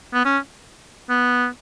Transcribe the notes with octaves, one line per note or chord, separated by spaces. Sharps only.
B3
C#4
B3